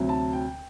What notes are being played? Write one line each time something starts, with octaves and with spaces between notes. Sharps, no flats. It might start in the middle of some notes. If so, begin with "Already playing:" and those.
Already playing: D2 C3 F#3 C4
A5
G5